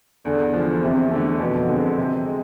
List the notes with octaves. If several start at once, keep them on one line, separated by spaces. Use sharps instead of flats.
E2 D3
D3 F3
E2 C3
D3 A3
F2 B2
D3 G#3 C4
C3
G#3